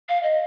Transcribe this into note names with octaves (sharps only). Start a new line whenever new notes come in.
F5
D#5